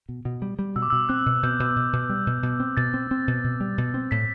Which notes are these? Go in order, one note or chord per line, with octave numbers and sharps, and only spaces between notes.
B2
B2
G3
G3
B2 E6
D6
B2 E6
C4 F#6
B2
B2 G6
B2
B2
B2
G3
B2
B2
C4
B2 A6
C4
C4
B2
B2
G3
B2
C4
A2 B6